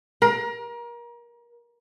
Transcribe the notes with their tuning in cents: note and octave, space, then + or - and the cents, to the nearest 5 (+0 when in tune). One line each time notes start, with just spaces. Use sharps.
A#4 +30